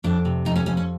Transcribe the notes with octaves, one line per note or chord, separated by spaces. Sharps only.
F2 D4
C3
F2 D#4
C#4
F2 C#4
C#4